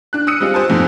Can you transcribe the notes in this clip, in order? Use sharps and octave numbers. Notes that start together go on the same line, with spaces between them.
D4 F#6
D#6 E6 F#6 C#7 D#7
G3 G#3 C4 F4
G4 C5 G#5 A5
F2 G#2 A3 C4